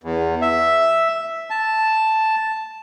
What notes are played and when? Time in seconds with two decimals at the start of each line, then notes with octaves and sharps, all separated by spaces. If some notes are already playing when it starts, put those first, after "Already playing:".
0.04 E2
0.42 E5
1.50 A5